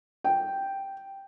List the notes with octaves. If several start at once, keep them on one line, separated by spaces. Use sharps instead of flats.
G5